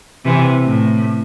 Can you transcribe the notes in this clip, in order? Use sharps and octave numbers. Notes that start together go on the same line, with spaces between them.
C3 E3
A2